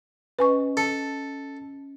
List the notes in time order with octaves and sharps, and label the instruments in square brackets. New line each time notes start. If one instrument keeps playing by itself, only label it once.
[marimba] C#4 D#5 [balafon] B4 G#5 C#6
[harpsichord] A4